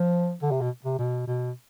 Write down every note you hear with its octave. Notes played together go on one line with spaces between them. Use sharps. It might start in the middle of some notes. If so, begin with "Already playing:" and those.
Already playing: F3
D3
C3
B2
C3
B2
B2